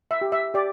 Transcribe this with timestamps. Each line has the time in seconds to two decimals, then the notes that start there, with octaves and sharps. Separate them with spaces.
0.11 E5
0.21 G4
0.32 E5
0.54 G4 D5